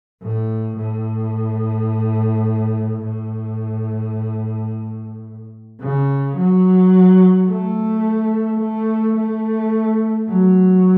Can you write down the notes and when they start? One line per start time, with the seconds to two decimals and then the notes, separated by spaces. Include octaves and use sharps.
0.22 A2
0.77 A2
3.02 A2
5.81 C#3
6.37 F#3
7.49 A3
8.60 A3
9.17 A3
10.29 F#3